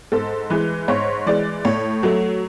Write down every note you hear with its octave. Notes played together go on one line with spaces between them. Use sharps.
G#2 A4
E3 G#3 B4
G#2 C#5
E3 G#3 D5
A2 C#5
F#3 A3